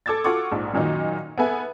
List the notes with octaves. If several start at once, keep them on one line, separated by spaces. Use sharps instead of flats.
A4 D6 E6 G#6 A6
F4 F#4 A4 F#5 C#6 D6
A#1 G#2
F#2 A#2 D#3 F#3 D#4
B3 G#4 A4 B4 E5 G#5